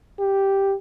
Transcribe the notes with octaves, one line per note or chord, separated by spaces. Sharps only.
G4